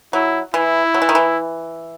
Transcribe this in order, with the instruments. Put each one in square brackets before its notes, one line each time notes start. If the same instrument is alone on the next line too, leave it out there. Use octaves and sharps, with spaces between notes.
[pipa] F#3 [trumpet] E4
[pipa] E3 [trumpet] E4
[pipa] F#3
E3
D#3
E3